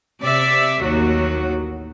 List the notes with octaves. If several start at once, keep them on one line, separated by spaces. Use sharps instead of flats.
C3 D5 E5
A1 D#2 F#3 F#4